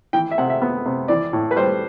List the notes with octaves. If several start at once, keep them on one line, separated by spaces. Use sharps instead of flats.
E3 G5
E5
C3 F#5
E5
B3
C3
E3 D5
A2
B4
G3 C5